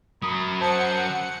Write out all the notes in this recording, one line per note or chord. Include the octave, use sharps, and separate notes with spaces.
F#3 A#4 B5 D#6
C5 F#5 A5 C#7